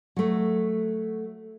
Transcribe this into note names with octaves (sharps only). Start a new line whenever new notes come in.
F#3 A3